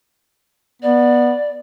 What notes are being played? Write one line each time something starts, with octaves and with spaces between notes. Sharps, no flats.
B3 D5